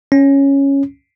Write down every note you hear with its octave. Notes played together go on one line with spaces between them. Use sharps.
C#4